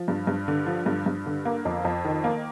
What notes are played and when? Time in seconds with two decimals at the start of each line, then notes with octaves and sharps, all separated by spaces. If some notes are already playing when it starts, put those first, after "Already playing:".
Already playing: F3
0.08 G2
0.27 G2
0.48 D3
0.66 F3
0.86 G2
1.06 G2
1.26 D3
1.45 A#3
1.65 F2
1.85 F2
2.05 D#3
2.24 A#3